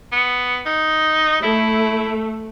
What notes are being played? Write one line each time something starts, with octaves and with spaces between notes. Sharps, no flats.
B3
D#4
A3 E4